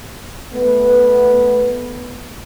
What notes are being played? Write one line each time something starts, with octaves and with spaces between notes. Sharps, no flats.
A3 B3 B4